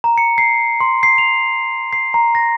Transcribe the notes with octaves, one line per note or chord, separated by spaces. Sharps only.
A#5
C#7
C7
C6
C7
F7
C7
A#5
A#6